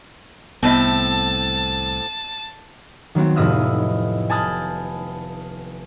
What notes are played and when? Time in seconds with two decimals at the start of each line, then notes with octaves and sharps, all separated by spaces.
0.63 C2 A2 B3 C4 D#5 A5
3.15 D#3 F#3 B3 C4
3.36 F1 A2 B4 D#5 E5 F6
4.29 G#5 A5 B5 D#6 F6 G6